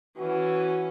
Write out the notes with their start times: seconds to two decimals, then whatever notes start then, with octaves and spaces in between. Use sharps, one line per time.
0.18 E3 C#4 F#4